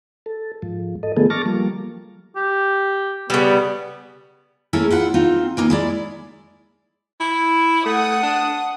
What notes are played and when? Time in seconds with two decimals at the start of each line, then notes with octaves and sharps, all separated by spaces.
0.26 A4
0.62 G#2 F3
1.03 A4 D#5
1.17 D3 F3 A3 B3 G#4 A4
1.30 A5 C#6 D6 F6 A6 A#6
1.46 F3 G3 A#3
2.36 G4
3.30 C#3 G3 B3
4.73 A3 A#3 C#4 E4 G#4
4.90 F4 B4 F#5
5.14 C4 D#4 F4
5.57 E3 A#3 D#4
5.70 G#3 E4 D5
7.20 E4
7.85 A3 F#5 D#6
8.23 D4